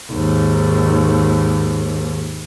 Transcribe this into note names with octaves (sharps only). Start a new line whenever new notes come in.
D#2 G#2